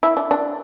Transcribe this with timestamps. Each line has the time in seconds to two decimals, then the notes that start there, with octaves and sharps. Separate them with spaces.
0.03 E4
0.17 D4
0.31 D4